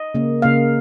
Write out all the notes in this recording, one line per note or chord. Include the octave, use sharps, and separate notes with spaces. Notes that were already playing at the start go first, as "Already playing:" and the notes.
Already playing: D#5
C#3 A#3
C#3 A#3 F5